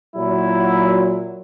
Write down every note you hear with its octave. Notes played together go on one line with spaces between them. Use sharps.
A#2 F#3 E4